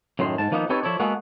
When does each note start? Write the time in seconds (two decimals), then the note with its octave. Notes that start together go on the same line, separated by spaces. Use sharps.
0.19 F#2 A2 D#3 C6
0.38 G#2 A5
0.51 D#3 F3 A#3 B3 D4 D#4
0.69 C4 D#4 G4 A4 B4 C#5
0.83 F3 E4 A4 C#5 D5
0.99 G#3 A#3 B3 F#4 G#4 A4